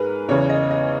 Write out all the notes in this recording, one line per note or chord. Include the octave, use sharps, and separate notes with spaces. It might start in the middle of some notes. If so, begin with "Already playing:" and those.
Already playing: G#2 G#4 A#4 B4
E2 C#3 E3 C#5
D#5
D#5